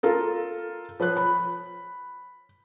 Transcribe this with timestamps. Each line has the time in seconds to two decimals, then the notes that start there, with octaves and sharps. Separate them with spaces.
0.03 F4 A4 A#4
1.00 F3 B4 C#5 F#6
1.17 B5